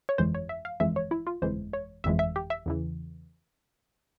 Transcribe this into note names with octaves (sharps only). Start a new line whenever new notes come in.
C#5
G1 F2 E3 G#3 C5
C#5
E5
F5
G1 F2 E3 G#3 E5
C#5
E4
F4
G1 F2 E3 G#3 C5
C#5
G1 F2 E3 G#3 E5
E5
G4
E5
E2 C#3 E3